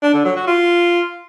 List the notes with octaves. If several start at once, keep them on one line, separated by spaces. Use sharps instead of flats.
D4
D3
F#3
F#4
F4